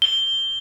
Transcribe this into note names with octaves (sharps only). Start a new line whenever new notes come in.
G7